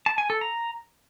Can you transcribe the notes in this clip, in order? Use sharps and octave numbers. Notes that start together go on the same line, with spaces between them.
A5
G#5
A4
A#5